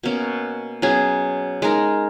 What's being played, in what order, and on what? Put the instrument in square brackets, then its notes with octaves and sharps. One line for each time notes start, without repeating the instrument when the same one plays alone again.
[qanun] B2 A#3 C#4
B2 F#3 C#4 G#4
G#3 D#4 A#4